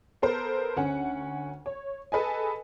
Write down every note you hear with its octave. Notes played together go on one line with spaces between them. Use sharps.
B3 A4 A#4 C5
D2 C#4 F#5
C#5
G#4 A4 B4 D#5 G#5